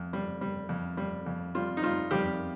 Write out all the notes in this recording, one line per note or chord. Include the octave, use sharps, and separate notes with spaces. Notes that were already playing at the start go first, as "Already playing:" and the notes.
Already playing: F2
G3
G3
F2
G3
F2
G3 F4
D#4
G3 F4
F2 G3 G4